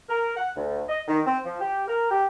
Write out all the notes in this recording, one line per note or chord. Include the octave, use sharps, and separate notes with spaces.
A#4
F#5
D2
D#5
D#3
C4
F3
G4
A#4
G4